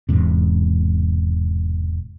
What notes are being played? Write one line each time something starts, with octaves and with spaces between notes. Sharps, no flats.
E1 E2 G#2 C3